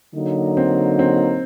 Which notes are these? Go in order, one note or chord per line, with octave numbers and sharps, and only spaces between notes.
D3 F#3 A#3 D#4
C4
C4